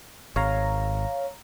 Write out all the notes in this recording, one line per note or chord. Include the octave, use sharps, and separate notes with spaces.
G#1 C#5 F5 A#5